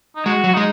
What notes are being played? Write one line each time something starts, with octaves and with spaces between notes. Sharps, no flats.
D#4
G#3 F#4
F#3
F#4
G#3 D#4